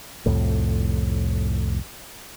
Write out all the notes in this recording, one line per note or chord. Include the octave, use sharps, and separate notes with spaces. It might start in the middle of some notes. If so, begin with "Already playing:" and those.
C2 F2 A2